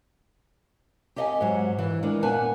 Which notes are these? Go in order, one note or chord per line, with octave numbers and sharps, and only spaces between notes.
G4 G#4 D#5 E5 F#5 G#5
G#2 F#3
E3
D#3 G#3 D4
A#2 B3 B4 G#5 A5